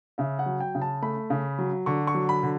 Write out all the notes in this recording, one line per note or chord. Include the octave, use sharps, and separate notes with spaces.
C#3 E5
F#5
F#3
G5
C#3
A5
A3 B5
C#3
F#3
D3 C#6
C#6
F#3
B5
D3